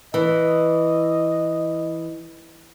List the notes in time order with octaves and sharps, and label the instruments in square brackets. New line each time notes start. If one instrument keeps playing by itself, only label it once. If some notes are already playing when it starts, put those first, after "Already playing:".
[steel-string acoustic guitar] E3 [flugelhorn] D#5